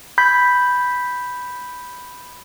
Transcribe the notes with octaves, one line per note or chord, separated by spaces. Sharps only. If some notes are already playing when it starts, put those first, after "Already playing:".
B5 G6 G#6 B6